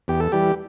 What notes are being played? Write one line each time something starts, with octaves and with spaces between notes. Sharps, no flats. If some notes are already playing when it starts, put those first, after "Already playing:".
E2 G4
A4
E3 G3 G4